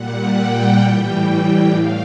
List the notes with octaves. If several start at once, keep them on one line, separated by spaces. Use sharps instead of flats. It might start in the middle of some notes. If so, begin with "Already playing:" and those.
Already playing: A#2 G3 F#5
G5
A2 E3 G3 G5
G5
A2 F5